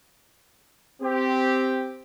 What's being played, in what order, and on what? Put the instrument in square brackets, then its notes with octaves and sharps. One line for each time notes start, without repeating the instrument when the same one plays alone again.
[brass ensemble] C4 G4